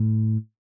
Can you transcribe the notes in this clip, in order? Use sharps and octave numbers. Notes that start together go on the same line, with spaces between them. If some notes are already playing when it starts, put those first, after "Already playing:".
Already playing: A2